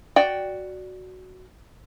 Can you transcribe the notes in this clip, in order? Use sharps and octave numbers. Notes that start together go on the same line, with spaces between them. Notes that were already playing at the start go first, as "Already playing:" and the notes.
F#4 D5 G5